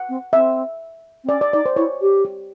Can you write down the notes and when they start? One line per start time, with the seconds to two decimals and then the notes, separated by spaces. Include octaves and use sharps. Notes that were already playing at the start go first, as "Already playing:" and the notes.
Already playing: F#5
0.09 C4
0.33 C4 E5
1.24 C4
1.29 C#4 D5
1.41 D5
1.53 D#4 D5
1.66 C5
1.76 E4 C#5
2.01 G4
2.25 G4